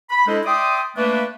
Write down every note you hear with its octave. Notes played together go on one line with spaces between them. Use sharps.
B5
G#3 D4 E4 A4 C5 D#5
D5 E5 G5 C6 D#6
A3 A#3 D4 B4